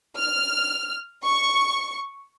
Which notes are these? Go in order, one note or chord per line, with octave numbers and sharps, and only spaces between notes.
F6
C#6